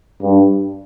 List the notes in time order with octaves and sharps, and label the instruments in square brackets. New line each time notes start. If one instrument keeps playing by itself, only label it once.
[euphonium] G2